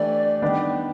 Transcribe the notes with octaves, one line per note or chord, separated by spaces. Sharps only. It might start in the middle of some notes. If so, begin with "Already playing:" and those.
Already playing: E3 A3 D4 G4 D5
D#3 G3 B3 D4 G4